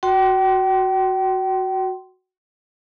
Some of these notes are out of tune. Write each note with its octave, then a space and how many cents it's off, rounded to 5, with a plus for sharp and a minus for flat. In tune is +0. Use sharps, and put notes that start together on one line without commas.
F#4 +0 G5 -40 C6 +0